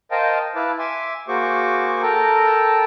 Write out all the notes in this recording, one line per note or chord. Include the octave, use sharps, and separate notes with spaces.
A#4 C5 D#5 F5 G5 A5
E4 B4 F5 A5 D6
E5 G#5 C6 D6
A#3 F#4 G#4 C5 C#6 D6
A4 A#4 G5 A5 A#5